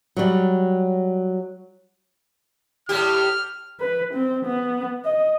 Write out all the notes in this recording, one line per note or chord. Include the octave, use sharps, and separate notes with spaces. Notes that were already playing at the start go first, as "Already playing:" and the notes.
F#3 G3
A2 G3 G4 F6
B4
C4
B3
D#5